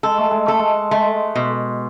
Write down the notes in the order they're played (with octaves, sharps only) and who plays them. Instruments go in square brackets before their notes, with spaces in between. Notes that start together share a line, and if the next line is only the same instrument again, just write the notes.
[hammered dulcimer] G#3 [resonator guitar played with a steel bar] A4
[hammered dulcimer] A3
G#3
[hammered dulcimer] A3 [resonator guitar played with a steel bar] A4
[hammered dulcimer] G#3
[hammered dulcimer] G#3 [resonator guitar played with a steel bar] A3
[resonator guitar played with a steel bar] B2